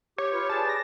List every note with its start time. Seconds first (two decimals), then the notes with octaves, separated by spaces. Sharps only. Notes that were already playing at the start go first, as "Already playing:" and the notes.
0.18 G4 C#5
0.31 F4 B4 C6
0.50 G#4 B4 D5 A5
0.69 A#6